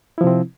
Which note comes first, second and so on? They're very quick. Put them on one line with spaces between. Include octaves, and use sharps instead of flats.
E4 F3 C3 C4